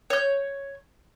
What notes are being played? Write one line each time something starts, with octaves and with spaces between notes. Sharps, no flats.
C#5 G6